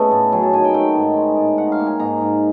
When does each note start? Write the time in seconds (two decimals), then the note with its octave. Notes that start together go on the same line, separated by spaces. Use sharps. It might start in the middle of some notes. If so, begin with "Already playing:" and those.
Already playing: C#3 A3 B3 D#5 A5
0.11 A2
0.32 F#3 G#5
0.43 A5
0.53 D#3 G#5
0.64 G5
0.74 A3 G5
0.96 G#2
1.17 G#3
1.37 A2
1.58 D#4 F#5
1.72 F5
1.79 A#3
1.86 G#5
2.00 G#2 A#5
2.21 G#2